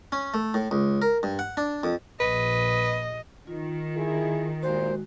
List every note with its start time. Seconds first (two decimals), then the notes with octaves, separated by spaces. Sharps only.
0.12 C#4
0.34 A3
0.54 A2
0.71 C#2
1.02 A#4
1.23 G2
1.39 F#5
1.57 D4
1.83 F2
2.20 A#1 B4 D#5
3.47 D#3 F4
3.96 E4 G#4
4.63 E2 G2 A#2 G#3 F#4 C5